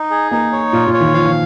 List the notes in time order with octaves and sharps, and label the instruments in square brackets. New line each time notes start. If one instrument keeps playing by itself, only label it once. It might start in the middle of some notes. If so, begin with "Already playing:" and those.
Already playing: [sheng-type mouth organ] D#4
G#4
[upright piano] A#3 [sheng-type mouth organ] D#4
[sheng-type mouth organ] C#5
[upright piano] A#2 [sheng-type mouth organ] F4
[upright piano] A#2
[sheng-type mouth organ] C#5
[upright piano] D#3
[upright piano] F3 [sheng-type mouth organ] F5
[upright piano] F3